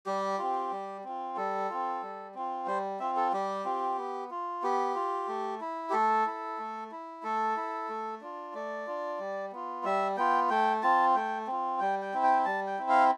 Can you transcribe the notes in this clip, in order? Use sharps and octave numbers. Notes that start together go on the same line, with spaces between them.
G3 G4
C4 F4
G3
C4 F4
G3 A4
C4 F4
G3
C4 F4
G3 C5
C4 F4 E5
A4
G3 G4
C4 F4
B3
F4
B3 G4
F4
A3
E4
G4
A3 A4
E4
A3
E4
A3 A4
E4
A3
D4 F4
A3 D5
D4 F4
G3
B3 F4
G3 E5
B3 F4 G5
A3 G5
C4 F4 A5
A3 G5
C4 F4
G3 G5
G5
C4 E4
G5
G3 A5
G5
C4 E4
F5